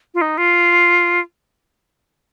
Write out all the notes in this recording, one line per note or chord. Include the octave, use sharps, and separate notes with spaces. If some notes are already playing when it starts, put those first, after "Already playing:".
F4
D#4
F4